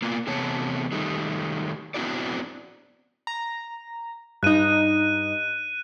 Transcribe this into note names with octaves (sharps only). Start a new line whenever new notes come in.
A#2 A#3 B3 F4
E2 C3 A3 B3 C#5 A5
D#3 G3 A3
B3 C4 D4 E4 F#4 D5
A#5
G2 D#4 F#6 D#7